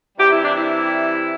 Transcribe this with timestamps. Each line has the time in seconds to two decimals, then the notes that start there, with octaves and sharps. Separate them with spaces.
0.17 C3 E3 G3 G4
0.30 E4
0.43 D4
0.56 E4